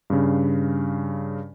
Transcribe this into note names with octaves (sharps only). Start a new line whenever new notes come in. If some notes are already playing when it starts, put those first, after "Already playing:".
G2 C#3